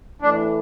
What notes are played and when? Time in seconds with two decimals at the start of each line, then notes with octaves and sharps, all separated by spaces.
0.22 A2 E3 A3 D4